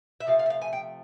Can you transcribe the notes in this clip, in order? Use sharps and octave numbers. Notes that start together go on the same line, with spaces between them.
E5
C3 F3 A3 F5
F5
E5
F5
G#5
G5